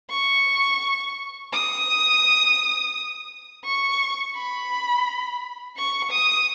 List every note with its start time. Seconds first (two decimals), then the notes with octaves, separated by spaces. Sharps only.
0.11 C#6
1.53 D#6
3.65 C#6
4.36 B5
5.77 C#6
6.11 D#6